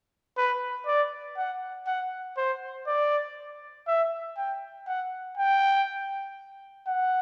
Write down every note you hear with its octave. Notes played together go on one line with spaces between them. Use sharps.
B4
D5
F#5
F#5
C5
D5
E5
G5
F#5
G5
F#5